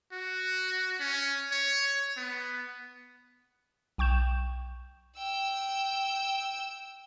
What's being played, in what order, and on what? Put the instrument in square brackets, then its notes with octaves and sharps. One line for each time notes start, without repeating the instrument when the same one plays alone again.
[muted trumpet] F#4
C#4
C#5
B3
[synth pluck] B1 G5 C#6 G6 E7
[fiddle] G5 E6